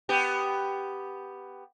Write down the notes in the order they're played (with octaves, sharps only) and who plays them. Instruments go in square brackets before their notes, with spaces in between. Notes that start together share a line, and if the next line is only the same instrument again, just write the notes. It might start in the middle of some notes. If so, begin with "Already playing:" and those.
[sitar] B3 G4